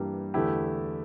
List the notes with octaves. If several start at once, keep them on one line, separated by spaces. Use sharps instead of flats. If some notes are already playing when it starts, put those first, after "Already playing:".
Already playing: G2 E3 G3 A#3
E2 D3 A3 E4 G4